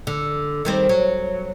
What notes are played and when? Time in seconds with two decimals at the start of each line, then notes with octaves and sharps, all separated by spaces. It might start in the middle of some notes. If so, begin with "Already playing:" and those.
0.07 D3
0.65 D#3 G3 C4
0.89 F#3